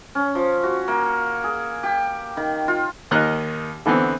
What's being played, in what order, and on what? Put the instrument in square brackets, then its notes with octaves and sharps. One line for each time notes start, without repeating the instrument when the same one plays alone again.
[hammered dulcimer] C#4
F3
F#4
A#3
G#4
G4
D#3
F4
[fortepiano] D#2 D#3 A#4 D#5 F#6
D3 E3 B3 C4